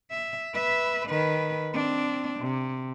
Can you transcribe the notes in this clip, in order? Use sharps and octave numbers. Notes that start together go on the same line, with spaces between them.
E5
B4 E5
D#3 B4
C4 D4
C3